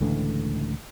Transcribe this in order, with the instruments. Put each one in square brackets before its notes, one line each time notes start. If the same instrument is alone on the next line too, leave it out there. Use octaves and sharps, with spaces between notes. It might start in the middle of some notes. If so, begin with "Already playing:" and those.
[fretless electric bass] C#2 A2 D3 E3